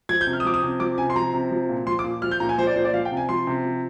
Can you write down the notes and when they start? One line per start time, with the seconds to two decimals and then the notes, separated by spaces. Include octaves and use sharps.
0.09 F3 G#6
0.21 G6
0.27 C3
0.33 F6
0.40 D#6
0.45 F3 D6
0.54 D#6
0.63 C3
0.80 F3 D6
0.98 C3 G#5
1.10 C6
1.16 F3 A#5
1.34 C3
1.51 F3
1.69 A#2
1.87 F3 C6
1.99 D6
2.04 A#2
2.22 F3 F6
2.31 G6
2.40 A#2 A#5
2.49 G#5
2.58 F3 C5
2.67 D5
2.76 A#2 C5
2.85 D5
2.93 F3 F5
3.05 G5
3.11 C3
3.17 G#5
3.29 F3 C6
3.47 C3
3.65 F3